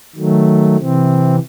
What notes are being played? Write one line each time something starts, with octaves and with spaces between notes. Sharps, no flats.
D#3 F#3 A3
C3 E3 C4